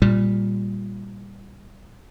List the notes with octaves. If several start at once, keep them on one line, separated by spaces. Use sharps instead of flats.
A#2 G3